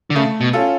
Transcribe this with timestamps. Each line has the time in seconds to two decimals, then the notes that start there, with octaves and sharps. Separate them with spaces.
0.10 D3
0.15 C#3 A3
0.41 B2
0.53 C#4 F4 A4